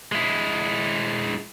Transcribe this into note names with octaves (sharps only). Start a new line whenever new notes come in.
G#3 E4